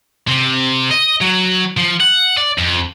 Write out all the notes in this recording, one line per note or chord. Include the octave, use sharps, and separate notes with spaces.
C3
D#5
F#3
F3
F#5
D5
F2